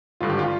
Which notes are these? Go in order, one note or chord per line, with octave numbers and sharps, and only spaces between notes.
G#1 G2 D3 F4
G4
F4